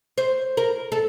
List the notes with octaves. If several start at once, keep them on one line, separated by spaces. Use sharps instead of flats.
C5
A#4
A4